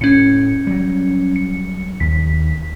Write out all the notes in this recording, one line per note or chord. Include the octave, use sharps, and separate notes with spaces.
A2 C#4 C#7
F#3 G3
C#7
D#2 B6